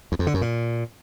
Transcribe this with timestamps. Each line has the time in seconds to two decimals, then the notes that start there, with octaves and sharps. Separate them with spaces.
0.12 E2
0.19 F2
0.27 D3
0.34 F#2
0.41 A#2